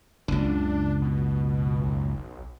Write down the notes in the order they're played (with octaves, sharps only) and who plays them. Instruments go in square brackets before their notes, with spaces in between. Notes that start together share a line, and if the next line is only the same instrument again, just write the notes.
[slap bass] F#1 C#2 [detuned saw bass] D4
[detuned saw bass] B2
B1